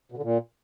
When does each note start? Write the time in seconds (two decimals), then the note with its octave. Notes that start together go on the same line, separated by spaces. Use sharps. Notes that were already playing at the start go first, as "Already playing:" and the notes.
0.12 B2
0.17 D3
0.23 A#2